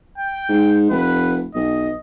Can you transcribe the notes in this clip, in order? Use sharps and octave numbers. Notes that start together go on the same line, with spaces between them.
G5
G#2
F1 B4
B1 D#5